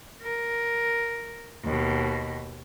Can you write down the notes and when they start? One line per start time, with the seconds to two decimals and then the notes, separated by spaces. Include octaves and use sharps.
0.22 A#4
1.64 D#2 B2